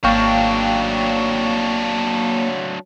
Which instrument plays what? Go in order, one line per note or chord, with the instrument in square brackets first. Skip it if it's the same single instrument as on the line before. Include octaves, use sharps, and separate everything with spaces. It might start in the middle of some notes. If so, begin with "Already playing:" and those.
[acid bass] G#1 [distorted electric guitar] F#3 D4 [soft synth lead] A#3 [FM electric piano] F5 G5 C#6